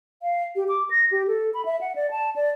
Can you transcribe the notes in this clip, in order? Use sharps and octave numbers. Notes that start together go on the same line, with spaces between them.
F5
G4
D6
A#6
G4
A4
B5
E5
F#5
D5
A5
D5